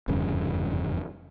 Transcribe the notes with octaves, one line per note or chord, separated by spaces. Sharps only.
F1 E2 G2 C#3